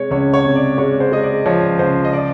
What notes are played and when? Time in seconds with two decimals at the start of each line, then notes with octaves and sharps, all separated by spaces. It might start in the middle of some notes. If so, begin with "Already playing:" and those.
Already playing: C3 G#3 C#5
0.11 C#2 C#5
0.34 C#5
0.45 C3
0.55 D5
0.78 G#3 C#5
1.00 C5
1.12 G#3 D#5
1.23 D5
1.46 F3 C#5
1.79 C#2 C5
2.05 D#5
2.13 D5